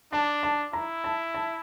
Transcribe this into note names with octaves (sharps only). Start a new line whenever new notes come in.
D4 A5
A5
E4 A#5
A5
A5